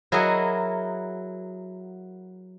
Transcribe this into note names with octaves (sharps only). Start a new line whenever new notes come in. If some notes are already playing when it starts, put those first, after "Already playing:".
F#3 E4 G#4 A#4 D#5 F#5